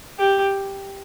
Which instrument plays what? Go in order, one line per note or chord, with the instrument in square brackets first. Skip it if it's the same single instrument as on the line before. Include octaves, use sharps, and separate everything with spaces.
[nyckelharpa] G4